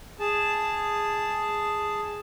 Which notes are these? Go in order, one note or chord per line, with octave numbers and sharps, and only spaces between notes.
G#4 A5